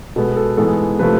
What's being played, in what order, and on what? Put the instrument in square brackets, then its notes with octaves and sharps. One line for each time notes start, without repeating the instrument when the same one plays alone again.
[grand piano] B2 G#3 B3 A4
A4
G#2 E3 G#3 B3 A4
C3 F3 A3 B4